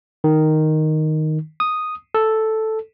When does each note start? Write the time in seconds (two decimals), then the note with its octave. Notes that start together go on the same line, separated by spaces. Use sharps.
0.24 D#3
1.60 D#6
2.14 A4